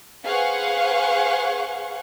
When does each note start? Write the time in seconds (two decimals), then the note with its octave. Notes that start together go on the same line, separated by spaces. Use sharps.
0.25 G#4 B4 C5 F5 F#5 C#6